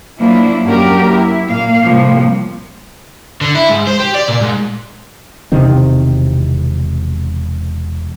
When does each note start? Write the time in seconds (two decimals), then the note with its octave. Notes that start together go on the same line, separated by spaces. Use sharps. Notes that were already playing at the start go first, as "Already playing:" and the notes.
0.19 F3 F#3 A#3 D4 E4
0.64 F#2 A#3 D4 F#4 G4 A#4
1.09 E4
1.47 A#2 A#3 F5
1.84 A2 C3 F3 G3 A#3
3.41 D3
3.55 E4
3.69 G#2
3.87 C5
4.00 G4
4.14 D5
4.28 A#2
4.41 G#2
5.52 E1 C3 D#3 C4